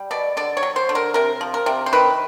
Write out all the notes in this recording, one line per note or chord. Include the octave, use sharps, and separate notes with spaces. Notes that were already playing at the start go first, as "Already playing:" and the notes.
Already playing: G3
B2 D5
D3 D5
C#5
F#3
C5
D3
A#4
C3 A#4
F3
A#4
C3
C5
D#3 B4